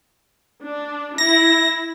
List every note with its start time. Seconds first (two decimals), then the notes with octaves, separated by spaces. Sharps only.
0.63 D4
1.18 E4 A#6